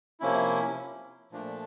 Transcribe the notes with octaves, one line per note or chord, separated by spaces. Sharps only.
C3 F3 A#3 C#4 E4
A#2 F3 A3 D4